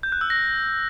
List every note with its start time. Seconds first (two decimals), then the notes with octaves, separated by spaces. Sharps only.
0.03 G6
0.12 F#6
0.21 E6
0.30 A#6